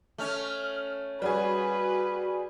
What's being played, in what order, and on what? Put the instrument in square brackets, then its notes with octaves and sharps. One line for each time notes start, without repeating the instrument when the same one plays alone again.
[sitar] A3 C#4 [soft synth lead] F6
[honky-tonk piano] G3 G#4 [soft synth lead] F#4 [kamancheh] B4